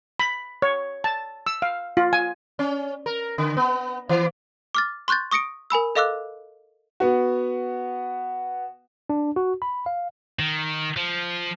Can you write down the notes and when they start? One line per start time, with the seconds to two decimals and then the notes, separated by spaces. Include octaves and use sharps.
0.20 B5
0.62 C#5
1.04 A5
1.47 E6
1.62 F5
1.97 F4
2.13 G#5
2.59 C#4
3.06 A#4
3.38 D3
3.57 B3
4.09 E3
4.75 D6 F6 A6
5.08 C6 C#6 F#6 G6 A6
5.31 C#6 D#6 A#6 C#7 D7
5.70 A#4 G#5 B5 E6
5.95 A4 D#5 F5 D6 E6 F#6
7.00 B3 F#4
9.10 D4
9.36 F#4
9.62 B5
9.86 F5
10.39 D#3
10.96 F3